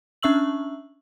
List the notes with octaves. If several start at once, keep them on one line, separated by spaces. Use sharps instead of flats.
C#4 D4 E5 C#6 E6 F#7